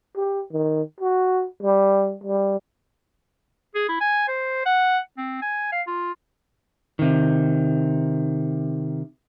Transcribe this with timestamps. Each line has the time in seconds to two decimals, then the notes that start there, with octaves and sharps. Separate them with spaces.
0.16 G4
0.52 D#3
1.00 F#4
1.63 G3
2.24 G3
3.75 G#4
3.89 E4
4.00 G#5
4.28 C5
4.66 F#5
5.17 C4
5.42 G#5
5.72 F5
5.87 F4
6.99 C3 D#3